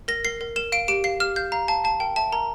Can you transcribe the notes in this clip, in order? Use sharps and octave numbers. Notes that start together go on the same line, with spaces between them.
A#4 A#6
A#4 C7
A#4
A#4 E7
F5 D7
G4 D7
F5 C7
G4 F6
F5 G6
F5 A#5
F5 A5
F5 A5
A#4 G5
E5 A5
A#4 A#5